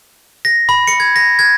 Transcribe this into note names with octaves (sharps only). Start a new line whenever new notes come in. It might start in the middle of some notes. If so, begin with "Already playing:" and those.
A#6
B5
C#7
G#6
A#6
G#6